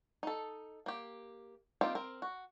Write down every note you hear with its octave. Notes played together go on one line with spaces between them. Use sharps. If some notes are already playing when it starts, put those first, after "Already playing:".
D#4 A4
A#3 G4
A#3 C4 D#4 F4 G4
C4 A#4
F#4